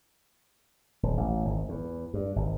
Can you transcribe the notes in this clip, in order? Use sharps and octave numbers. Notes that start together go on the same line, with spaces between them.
D#1
A1
G#1
E2
G2
G#1